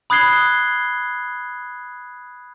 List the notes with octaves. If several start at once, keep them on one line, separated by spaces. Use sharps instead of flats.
B5 D#6 F#6 G#6 C7 G7